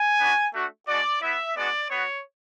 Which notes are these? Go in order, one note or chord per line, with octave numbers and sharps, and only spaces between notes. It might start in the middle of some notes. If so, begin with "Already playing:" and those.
Already playing: G#5
B3 D4 F#4
A3 D4 F#4
G#3 D4 F#4 D5
B3 E4 E5
G#3 B3 D4 F#4 D5
B3 F#4 C#5